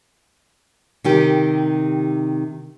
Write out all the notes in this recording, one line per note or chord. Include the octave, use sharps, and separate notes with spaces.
C3 D#3 G4